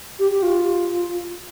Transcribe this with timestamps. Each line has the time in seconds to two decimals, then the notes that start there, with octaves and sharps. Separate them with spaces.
0.19 G4
0.32 G4
0.43 F4